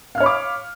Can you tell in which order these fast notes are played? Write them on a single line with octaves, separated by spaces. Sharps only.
F5 F6 C#5 B5 D6